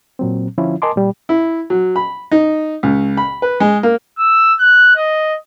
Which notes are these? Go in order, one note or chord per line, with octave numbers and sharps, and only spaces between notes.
A#2 F#3 C4
D3 F3 C#4 E4 F4
A#4 D#5 G#5 A5 C6 D6
A#2 G3
E4
F#3
B5
D#4
C#2
B5
B4
G#3
A#3
E6
F#6
D#5